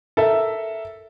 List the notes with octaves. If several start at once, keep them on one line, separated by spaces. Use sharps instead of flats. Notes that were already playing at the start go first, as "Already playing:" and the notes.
A4 A#4 E5